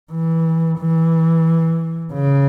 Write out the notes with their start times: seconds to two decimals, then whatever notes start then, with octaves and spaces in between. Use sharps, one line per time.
0.12 E3
0.79 E3
2.13 C#3